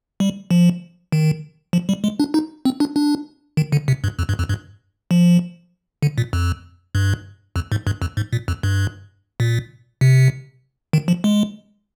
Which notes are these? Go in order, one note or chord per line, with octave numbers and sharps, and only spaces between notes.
G3
F3
D#3
F3
G3
G#3
D4
D#4
C4
D4
D4
D#3
D3
C3
G2
F2
G2
F2
G2
F3
D3
A#2
F2
G2
F2
G#2
G2
F2
G#2
A#2
F2
G2
A#2
C3
D#3
F3
G#3